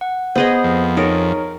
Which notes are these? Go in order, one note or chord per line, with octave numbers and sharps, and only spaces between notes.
F#5
B3 G#4 C5 D#5
F2
D#4 G#4 A#4 C#5